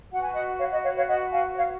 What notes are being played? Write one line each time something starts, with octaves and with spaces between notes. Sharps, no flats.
F#4 B4 F#5
G#5
D#5 F#5
C#5 F5
D#5
C#5 F5
C#5 F5
D#5 F#5
F5 G#5
C#5 F5